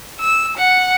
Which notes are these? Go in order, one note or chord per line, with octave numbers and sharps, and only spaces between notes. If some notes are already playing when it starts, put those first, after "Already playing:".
E6
F#5